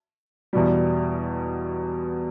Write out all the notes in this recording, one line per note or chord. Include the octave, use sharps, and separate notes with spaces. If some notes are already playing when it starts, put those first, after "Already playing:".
E2 B2 G3